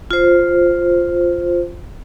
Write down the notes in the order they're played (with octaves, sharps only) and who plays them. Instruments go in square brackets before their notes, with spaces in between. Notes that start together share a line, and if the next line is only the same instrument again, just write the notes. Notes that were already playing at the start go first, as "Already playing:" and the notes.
[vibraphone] F4 C5